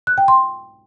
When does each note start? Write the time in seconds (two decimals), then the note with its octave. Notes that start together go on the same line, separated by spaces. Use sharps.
0.07 F#6
0.18 G5
0.28 C6